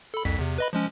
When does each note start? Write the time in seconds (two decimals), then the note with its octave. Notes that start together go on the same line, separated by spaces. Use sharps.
0.14 A4 B5
0.25 C2 F2 B6
0.39 E2 C3
0.58 B4 D#5 B5
0.73 F3 G#3 C#4